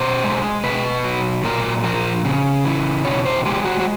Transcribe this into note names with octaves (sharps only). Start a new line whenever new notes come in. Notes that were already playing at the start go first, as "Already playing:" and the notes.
Already playing: B2 C5
G#3
B2 B4
F#3
A#2 A#4
F3 A#4
C#3
E3
B2 C#5
C5
G#3 G4
F#4
F#4